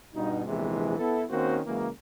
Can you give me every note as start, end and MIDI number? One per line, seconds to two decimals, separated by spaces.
0.15 0.43 43
0.15 0.43 47
0.15 0.43 63
0.46 0.98 34
0.46 0.98 40
0.46 0.98 48
0.46 0.98 52
0.46 0.98 56
0.99 1.24 59
0.99 1.24 64
0.99 1.24 69
1.30 1.60 51
1.30 1.60 58
1.30 1.60 60
1.30 1.60 61
1.30 1.60 66
1.30 1.60 72
1.67 1.89 49
1.67 1.89 52
1.67 1.89 54
1.67 1.89 56
1.67 1.89 58